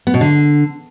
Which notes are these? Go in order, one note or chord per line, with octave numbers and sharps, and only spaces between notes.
B3
B2
D3